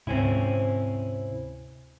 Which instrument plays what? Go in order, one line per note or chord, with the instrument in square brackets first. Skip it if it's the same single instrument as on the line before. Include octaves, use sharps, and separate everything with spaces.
[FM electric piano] D2 G#2 [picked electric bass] C3 [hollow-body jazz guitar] C4 C#4 E4